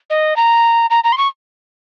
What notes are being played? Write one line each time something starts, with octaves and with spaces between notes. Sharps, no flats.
D#5
A#5
A#5
A#5
C6
C#6